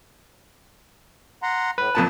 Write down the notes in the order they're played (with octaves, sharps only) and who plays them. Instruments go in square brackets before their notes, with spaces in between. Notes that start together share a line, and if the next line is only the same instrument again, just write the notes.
[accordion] F#5 A#5 C6
[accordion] A2 [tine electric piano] B4
[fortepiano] F2 A#2 A5 [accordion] C#3